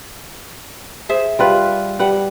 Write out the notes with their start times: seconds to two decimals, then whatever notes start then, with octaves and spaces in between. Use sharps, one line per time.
1.09 G#4 C5 E5
1.39 G3 F4 B4
1.99 G3 B4 F#5